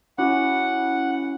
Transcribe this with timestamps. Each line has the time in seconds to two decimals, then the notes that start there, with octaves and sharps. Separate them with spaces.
0.18 C#4 E4 F#4 F#5